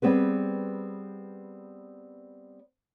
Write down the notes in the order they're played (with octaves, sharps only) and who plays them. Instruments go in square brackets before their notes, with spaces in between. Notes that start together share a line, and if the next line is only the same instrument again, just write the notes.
[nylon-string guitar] G3 B3 C4 G#4 B4